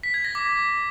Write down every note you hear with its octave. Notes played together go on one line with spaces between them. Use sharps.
B6
G#6
A#6
D6